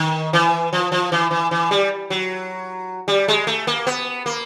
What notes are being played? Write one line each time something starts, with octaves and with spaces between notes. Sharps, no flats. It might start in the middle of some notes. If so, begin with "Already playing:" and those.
Already playing: D#3
E3
F3
F3
E3
E3
E3
G3
F#3
G3
G#3
A3
A#3
B3
A#3